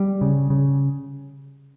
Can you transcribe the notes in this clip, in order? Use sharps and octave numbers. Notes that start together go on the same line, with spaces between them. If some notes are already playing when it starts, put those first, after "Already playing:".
Already playing: G3
C#3
C#3